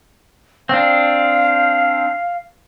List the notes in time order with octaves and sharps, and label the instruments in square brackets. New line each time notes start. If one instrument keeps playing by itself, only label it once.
[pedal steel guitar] C4 D4 [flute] F5